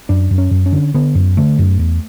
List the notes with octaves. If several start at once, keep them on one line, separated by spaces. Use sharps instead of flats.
F#2 D4
F#2
C#4
F#2
C#4
D3
D3 B3
F#2
D3 A3
F#2
E2